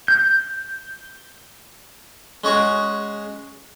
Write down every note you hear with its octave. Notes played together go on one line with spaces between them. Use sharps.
G6
G#3 C#4 F#4 G#4